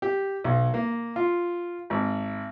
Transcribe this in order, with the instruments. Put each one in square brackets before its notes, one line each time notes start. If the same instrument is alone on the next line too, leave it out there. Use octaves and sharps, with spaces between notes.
[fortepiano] G4
B1
A#3
F4
G#1